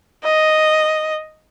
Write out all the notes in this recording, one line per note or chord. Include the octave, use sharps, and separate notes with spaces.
D#5